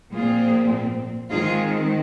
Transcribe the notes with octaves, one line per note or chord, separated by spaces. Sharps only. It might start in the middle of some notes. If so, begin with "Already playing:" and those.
A#2 F3 C4 F4 G#4
D#3 G#3 C4 F4 G#4